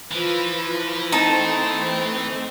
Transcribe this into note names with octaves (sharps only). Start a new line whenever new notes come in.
E3 F3 B4
A3 C4 D#4 A5